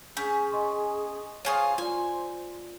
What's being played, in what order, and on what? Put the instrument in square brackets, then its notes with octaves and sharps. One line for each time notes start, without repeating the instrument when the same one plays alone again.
[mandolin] C#4 [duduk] G#4 [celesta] G6 B6
[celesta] D#5 C6 C#6
[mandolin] F4 G#4 F5 [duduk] C5 [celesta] C#5 C#6 D#6
[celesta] F4 D5 [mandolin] G#5